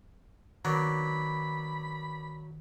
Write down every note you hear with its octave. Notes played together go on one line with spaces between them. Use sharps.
D#3 F#3 A#3 B3 D4 B5